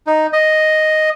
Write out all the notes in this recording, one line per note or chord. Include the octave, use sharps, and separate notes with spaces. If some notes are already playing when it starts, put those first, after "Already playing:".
D#4
D#5